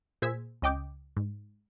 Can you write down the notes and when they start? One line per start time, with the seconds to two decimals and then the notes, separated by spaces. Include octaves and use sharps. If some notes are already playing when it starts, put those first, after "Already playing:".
0.22 A#2 G#4 C5 E6 G#6 B6
0.62 C#2 C#4 D#5 G5 D6 G6
1.17 G#2